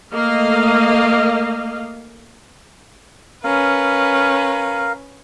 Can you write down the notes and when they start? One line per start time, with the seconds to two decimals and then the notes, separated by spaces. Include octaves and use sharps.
0.12 A3 A#3 D#5 F5
3.44 C#4 A#4 B4 F5